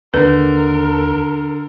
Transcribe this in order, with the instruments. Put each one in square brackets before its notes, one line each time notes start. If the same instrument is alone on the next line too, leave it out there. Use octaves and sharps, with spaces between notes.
[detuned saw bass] D#2 [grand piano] D3 [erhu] A#4 [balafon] B4